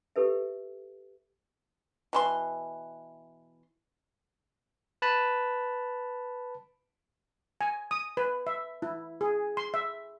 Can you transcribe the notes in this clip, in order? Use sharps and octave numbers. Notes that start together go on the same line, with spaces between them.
G4 A4 B4 E5
B2 E3 C6
B4 A5 B5
G#5
D#6
B4
E5
E4
G#4
C6
E5